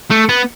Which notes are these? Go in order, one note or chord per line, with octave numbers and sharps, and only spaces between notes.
A3
B3